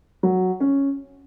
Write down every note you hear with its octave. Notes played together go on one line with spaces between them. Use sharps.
F#3
C#4